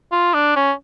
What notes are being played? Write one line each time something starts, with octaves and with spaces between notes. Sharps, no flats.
F4
D4
C#4